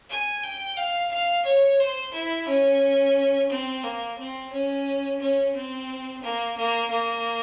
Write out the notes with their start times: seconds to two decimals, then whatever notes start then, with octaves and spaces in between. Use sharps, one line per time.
0.10 G#5
0.43 G5
0.77 F5
1.12 F5
1.46 C#5
1.80 C5
2.14 E4
2.49 C#4
3.50 C4
3.84 A#3
4.18 C4
4.53 C#4
5.21 C#4
5.55 C4
6.23 A#3
6.57 A#3
6.91 A#3